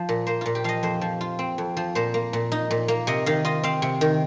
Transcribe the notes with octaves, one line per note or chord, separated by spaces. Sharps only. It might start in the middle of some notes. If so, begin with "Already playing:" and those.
Already playing: F3
A#2
A#3 C5
A#2 F4
G4
F3 D#5 F5
F2 C5
F3
F4
C4
F2
F3
A#2 C5
A#3
A#2
D#4
A#2
A#3
C3 D#5
D#3 F5
F4 D#5
C4 F5
C3
D#3